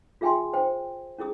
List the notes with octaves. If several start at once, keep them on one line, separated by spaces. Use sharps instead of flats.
F4 G#4 E5 G5 G#5 C6
C5 G5
C#4 E4 G#4 D#6